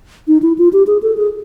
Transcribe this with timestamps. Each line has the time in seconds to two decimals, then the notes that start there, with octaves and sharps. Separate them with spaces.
0.28 D#4
0.42 E4
0.58 F4
0.73 G4
0.87 G#4
1.03 A4
1.17 G#4